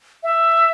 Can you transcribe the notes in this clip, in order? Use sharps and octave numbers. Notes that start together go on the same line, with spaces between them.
E5